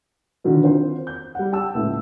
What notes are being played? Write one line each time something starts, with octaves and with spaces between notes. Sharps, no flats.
B2 D3 D#3 F#3
C4 F4 A#4 C5
G6
G3 F#5
G5 A5 E6
C#2 A2